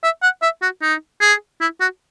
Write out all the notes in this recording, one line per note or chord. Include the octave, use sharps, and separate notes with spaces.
E5
F#5
E5
F#4
D#4
G#4
E4
F#4